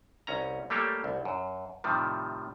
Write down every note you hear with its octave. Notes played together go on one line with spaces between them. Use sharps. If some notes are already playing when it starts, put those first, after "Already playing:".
C2 C#4 A#5
G3 A3 A#3 G4 A4 C#5
C2
F#2
A2 C3 D#3 F3 G3